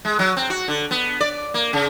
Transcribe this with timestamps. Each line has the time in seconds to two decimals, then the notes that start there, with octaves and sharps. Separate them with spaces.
0.05 G#3
0.19 F#3
0.37 C4
0.50 F#4
0.68 D3
0.91 B3
1.20 D5
1.54 A#3
1.73 C#3